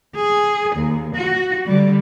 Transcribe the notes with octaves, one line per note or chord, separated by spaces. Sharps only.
G#4
D#2
F#4
D3 G3